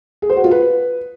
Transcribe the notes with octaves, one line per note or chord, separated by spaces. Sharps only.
G#4
C5
F#4
F4
B4